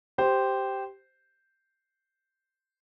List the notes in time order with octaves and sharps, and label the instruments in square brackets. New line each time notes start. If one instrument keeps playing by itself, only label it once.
[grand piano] G4 C5